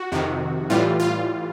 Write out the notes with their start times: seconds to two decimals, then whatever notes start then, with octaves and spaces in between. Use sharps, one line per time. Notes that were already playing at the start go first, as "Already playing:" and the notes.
Already playing: F#4
0.12 F2 C3 D#3
0.70 A2 E3 G3 F4
1.00 F4